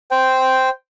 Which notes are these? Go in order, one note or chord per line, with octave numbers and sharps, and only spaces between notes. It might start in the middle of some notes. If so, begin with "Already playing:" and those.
C5 G5